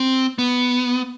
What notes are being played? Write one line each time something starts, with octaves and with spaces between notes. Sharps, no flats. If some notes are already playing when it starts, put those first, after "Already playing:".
Already playing: C4
B3